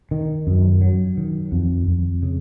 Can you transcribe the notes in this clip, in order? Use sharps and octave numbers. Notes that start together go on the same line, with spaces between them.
D#3
F#2
F#3
D#3
F2
F2
C#3